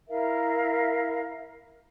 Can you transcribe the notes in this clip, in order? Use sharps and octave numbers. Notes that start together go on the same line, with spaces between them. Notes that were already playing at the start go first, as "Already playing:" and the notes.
E4 A#4 E5 F5